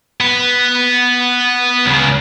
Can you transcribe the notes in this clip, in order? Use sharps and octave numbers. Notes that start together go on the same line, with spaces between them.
B3
C#2 C#3